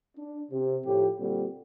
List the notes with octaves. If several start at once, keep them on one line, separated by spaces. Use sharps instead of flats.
D4
C3
A2 F3 G4
A#2 D3 G3 C4 F#4 A4